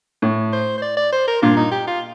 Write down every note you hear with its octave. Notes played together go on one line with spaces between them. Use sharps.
A2
C5
C5
D5
D5
C5
A#4
G2 A#2 F4
D#4
G4
F4